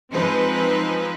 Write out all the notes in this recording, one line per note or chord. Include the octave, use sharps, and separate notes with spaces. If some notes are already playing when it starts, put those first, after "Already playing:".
F3 G#3 C4 D#4 B4